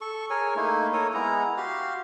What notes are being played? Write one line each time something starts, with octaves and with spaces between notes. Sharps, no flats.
A4 C#6
G#4 A#4 C#5 G#5
A3 A#3 D#4 E4
A4 A#4 C#5 D#6
G#3 B3 E4 A#5
F#4 G4 F5 C6